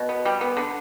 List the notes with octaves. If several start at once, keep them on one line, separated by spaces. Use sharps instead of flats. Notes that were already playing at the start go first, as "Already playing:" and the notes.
Already playing: B2
B3
G3
B3
D3